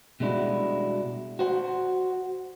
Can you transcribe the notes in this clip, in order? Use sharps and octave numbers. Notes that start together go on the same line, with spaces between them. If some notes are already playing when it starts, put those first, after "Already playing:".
B2 G3 G#3 D4 E4 F#4
F#4 C5 F#5